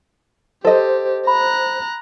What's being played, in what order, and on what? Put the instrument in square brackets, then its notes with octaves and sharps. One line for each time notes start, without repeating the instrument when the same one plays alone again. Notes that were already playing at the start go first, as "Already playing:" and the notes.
[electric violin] G4 [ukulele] A4 D#5 [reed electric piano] C5
[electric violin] A#5 F#6 [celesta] B5